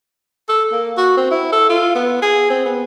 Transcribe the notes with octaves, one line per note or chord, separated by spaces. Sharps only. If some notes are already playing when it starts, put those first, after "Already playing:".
A4
A#3
F#4
C4
E4
A4
F4
B3
G#4
C4
B3